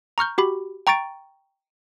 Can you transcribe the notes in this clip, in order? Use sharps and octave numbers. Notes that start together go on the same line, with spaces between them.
A#5 C#6 F6 G6
F#4 G4 B5
G5 A#5 C#6 A6 D7